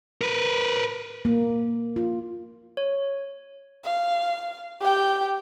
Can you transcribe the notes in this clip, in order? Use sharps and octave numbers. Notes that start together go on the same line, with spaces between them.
A#4 B4
A#3
F4
C#5
F5
G4 G5